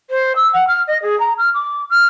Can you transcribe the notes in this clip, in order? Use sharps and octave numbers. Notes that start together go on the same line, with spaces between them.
C5
E6
F#5
F6
D#5
G#4
A#5
F6
D6
F6